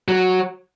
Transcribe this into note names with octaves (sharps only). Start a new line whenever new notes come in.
F#3